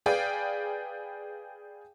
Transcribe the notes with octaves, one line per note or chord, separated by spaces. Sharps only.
G#4 B4 D5 F5 G5